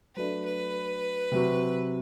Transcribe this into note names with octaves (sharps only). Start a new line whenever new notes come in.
F#3 A3 D4 B4
B4
C3 F#3 C4 F#4